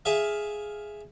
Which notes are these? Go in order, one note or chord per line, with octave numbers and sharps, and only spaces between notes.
G#4 E5 F5